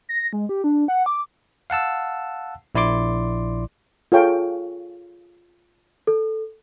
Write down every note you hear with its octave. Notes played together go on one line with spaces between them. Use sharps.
A#6
G#3
G4
D4
F#5
D6
F5 F#5 A5 E6
A#1 E4 D5 C6 D6
F4 G#4 A4 C#5 F5 G5
A4